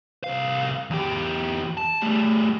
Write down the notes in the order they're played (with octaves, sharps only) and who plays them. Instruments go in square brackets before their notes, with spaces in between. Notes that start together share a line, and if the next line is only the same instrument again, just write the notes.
[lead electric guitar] C2 F5
E2 G4
A5
G3 A3